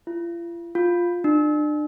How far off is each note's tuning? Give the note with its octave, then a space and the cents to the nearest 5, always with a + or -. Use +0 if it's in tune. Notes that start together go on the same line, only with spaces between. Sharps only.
F4 -45
F4 +5
D4 +35